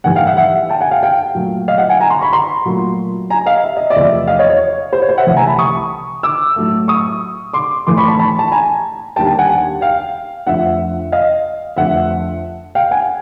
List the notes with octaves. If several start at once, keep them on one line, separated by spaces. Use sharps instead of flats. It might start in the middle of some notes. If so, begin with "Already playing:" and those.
G#2 E3 G3 F#5 G#5
F5 G5
E5 F#5
E5 F#5
G5 A5
F#5 G#5
F5 G5
F5 G5
A#2 F#3 A3
D#5 F5
E5 F#5
F#5 G#5
G#5 A#5
A#5 C6
B5 C#6
A#5 C6
A#2 F#3 A3
G#5 A#5
D#5 F5
E5
D#5
D5 E5
E2 C3 F3 A3
D#5 F5
C#5 D#5
C#5
C5
C#5
C5
E5 F#5
C2 C3 E3 A3
G#5 A#5
A5 B5
C#6 D#6
D6 E6
A2 F#3 A3
C#6 D#6
C6 D6
A2 E3 A3 C6 D6
B5 C#6
A5 B5
A5 B5
A5
G#5 A#5
D#2 D3 G3 G5 A5
G5 A5
F#5 G#5
F5 G5
F2 D3 F3 A3 E5 F#5
D#5 F5
F2 D3 F3 A3 E5 F#5
F5 G5
F#5 G#5